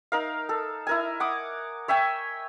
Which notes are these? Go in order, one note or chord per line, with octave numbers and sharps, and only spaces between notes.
D#4 A#4 F5
A4
E4 A#4 G#5
F#5 D6 D#6
C#5 E5 G5 G#5